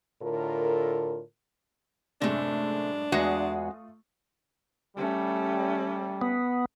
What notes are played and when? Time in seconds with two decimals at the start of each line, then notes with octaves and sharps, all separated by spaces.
0.21 A2 D3 F4 A4 A#4
2.21 F#2 A2 C3 G#3 A3 D4
3.12 E2 G#3 A3 F4 F#4 G#4 F#5 D#6
4.97 G3 A3 C#4
6.21 B3